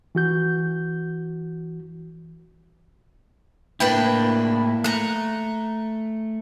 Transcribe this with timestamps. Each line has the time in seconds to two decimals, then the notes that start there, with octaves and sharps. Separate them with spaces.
0.15 E3 F#4 G6
3.80 A2 A#3 D4 E4 B4 G5
4.84 A3 A#5 F#6